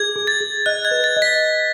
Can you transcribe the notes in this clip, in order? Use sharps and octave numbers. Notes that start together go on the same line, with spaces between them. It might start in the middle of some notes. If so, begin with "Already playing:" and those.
Already playing: G#4 G#6
G#4
A6
G#4
D#5 F#6
G#6
B4
A6
D#5
B6